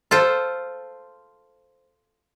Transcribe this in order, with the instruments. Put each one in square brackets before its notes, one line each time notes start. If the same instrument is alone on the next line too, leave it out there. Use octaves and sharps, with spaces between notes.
[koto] F4 A4 C5